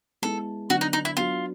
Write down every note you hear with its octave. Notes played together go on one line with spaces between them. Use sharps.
G#3 B3 E4 A4
D3 F#3 B3 D4 F#4
D#4
D#4
E4
F#3 B3 D4 F4 F#4